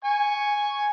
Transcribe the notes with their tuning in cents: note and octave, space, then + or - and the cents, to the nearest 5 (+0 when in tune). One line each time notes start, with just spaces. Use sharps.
G#5 +0 C#6 +0